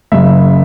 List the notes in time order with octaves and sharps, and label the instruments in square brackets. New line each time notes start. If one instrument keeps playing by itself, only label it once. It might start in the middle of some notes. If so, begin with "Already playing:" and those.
[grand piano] F#1 F#2 C#3 E5